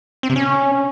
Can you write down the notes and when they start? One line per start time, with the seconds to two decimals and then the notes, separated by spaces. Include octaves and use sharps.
0.23 C4
0.30 C3
0.36 C#4